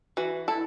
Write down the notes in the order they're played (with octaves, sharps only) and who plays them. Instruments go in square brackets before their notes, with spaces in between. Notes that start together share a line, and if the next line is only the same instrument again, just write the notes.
[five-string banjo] E3 [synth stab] F#4
[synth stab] E4 [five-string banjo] A4